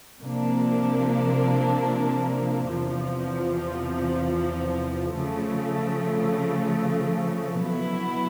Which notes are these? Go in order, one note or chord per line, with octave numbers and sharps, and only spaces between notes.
C3 F3 A#3 D4
E2 C3 F3
C#3 F3 A3
B2 F#3 B3 E4